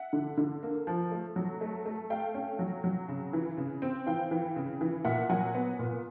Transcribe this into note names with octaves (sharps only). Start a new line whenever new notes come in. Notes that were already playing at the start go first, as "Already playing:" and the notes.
Already playing: E5 F#5
D3
D3
A#3
F3
A3
F#3
A3
A3
A3 F5 G5
C#4
F#3
F#3
C#3
E3
C#3
C4
E3 F5 G5
E3
C#3
E3
A#2 E5 F#5
F#3 F#5 G#5
B3
A#2